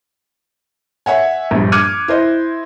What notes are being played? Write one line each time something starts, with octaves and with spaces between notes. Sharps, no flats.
C#5 E5 F#5 G#5
A#1 G2
D6 F6 F#6 G#6 C#7 D#7
E4 C5 D#5